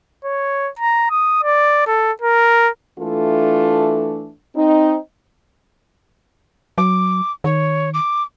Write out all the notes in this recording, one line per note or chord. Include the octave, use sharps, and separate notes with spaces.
C#5
A#5
D#6
D5
A4
A#4
E3 A3 D4 F4 A4
C4 D#4
F#3 D6
D#3 C#5
D6